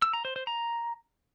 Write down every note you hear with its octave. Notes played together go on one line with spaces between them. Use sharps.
E6
A#5
C5
C5
A#5